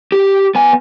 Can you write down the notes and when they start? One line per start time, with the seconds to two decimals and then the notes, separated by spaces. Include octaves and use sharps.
0.12 G4
0.55 B3 G#5